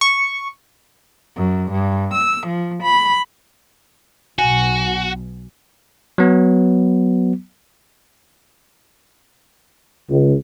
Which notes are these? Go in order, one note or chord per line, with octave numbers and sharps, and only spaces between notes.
C#6
F#2
G2
E6
F3
B5
B1 B2 F#4 G#5
F#3 B3
C#2